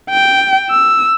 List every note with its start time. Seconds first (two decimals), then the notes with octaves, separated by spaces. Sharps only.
0.10 G5
0.70 E6